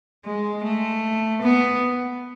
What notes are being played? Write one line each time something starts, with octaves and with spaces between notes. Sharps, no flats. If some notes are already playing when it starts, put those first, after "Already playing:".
G#3
A3
B3